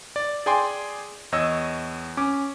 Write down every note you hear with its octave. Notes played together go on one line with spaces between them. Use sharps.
D5
G#4 D5 G5 G#5 C6 D6
E2 C#5 D#5 E6
C#4 D6